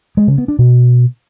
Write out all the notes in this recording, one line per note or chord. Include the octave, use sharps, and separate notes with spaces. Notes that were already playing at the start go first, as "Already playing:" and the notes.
G#3
C#3
B3
D4
B2